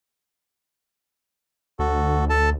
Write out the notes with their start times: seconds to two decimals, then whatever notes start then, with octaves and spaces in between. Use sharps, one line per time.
1.79 D2 F#4 A4
2.30 A4 A5